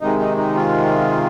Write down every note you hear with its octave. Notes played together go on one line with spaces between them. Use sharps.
C3 D#3 G#3 D#4
D#4
D#4
F4